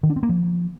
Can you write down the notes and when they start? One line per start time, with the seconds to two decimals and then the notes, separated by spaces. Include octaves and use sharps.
0.03 D#3
0.10 D4
0.16 C4
0.23 A#3
0.29 F3